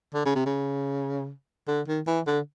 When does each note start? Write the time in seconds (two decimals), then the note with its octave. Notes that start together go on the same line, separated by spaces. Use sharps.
0.14 D3
0.25 C#3
0.35 C3
0.46 C#3
1.68 D3
1.87 D#3
2.07 E3
2.26 D3